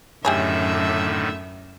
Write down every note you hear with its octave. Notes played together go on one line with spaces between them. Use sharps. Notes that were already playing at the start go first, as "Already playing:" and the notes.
F#2 A2 D3 D#3 G4 G#4 C#5 E5